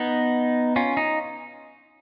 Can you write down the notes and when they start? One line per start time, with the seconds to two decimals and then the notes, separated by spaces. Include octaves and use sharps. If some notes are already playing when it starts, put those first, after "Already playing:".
Already playing: B3 D#4
0.76 C#4 F4
0.97 D#4